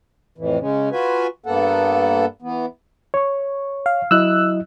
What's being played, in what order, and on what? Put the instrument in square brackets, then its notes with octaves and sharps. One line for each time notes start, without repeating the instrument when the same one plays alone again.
[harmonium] F2 A2 E3
C#3 G#3 C#4
F4 F#4 B4 G#5
G2 A#3 B3 A4 F#5
E3 B3
[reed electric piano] C#5 C#6
[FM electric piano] F5
[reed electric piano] F#3 E4 D#5 [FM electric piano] E6 F#6